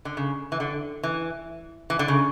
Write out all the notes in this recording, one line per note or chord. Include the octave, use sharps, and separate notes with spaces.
D3
C#3
E3
D3
E3
E3
D3
C#3